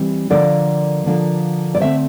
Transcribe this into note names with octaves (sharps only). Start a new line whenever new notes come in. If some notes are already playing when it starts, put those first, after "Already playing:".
Already playing: E3 G3 C4
D3 F3 A#3 D4 A#4 D5
D3 F3 A#3 D4
D5
D3 A3 C4 C5 E5